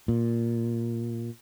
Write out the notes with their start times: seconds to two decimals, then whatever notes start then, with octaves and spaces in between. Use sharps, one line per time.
0.08 A#2